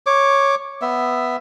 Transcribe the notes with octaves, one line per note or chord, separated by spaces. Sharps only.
C#5 D6
B3 E5